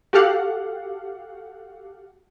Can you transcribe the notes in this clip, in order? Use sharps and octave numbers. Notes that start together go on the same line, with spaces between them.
F#4 G4 A4 F5 F#5